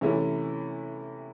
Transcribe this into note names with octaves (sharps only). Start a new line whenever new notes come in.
C3 E3 A3 C#4 E4